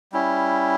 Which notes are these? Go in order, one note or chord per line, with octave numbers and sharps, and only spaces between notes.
G3 C#4 E4